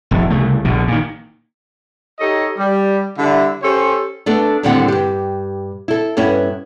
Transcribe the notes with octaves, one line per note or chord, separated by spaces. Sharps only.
E1 F2 A2
C2 C#3 A3
A#1 B2 D3
A#2 D#3
D#4 G4 A4 C#5 D#5
G3
D3 G3 E4
C#4 G4 A4 C5 C#5
A3 B3 D4 A4
D#2 A2 D3 G3 C4 F#5
G2 G4
E4 A4
G2 B3 C#4 E4